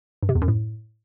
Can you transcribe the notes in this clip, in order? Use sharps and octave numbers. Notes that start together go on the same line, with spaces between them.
G2
C3
E2
F#2
A2